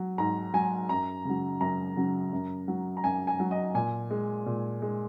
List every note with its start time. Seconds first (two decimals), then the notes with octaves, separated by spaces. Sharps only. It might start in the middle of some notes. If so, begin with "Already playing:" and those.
Already playing: F#3
0.18 G#2 A#5
0.54 F#3 G#5
0.89 F#2 A#5
1.25 C#3 F#3
1.61 F#2 A#5
1.97 C#3 F#3
2.33 F#2
2.68 F#3
2.97 A#5
3.04 F#2 G#5
3.27 G#5
3.40 F#3
3.51 D#5
3.74 A#2 G#5
4.11 G#3
4.46 A#2
4.82 G#3